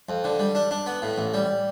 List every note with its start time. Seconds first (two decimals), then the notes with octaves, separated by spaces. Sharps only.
0.09 F2
0.24 D3
0.39 G3
0.55 D4
0.71 D4
0.86 B3
1.02 A2
1.18 A1
1.34 G3